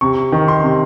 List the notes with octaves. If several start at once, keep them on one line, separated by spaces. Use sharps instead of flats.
C3 C#6
D#3
C6
C3